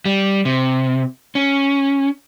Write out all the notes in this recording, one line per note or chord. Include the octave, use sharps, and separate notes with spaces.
G3
C3
C#4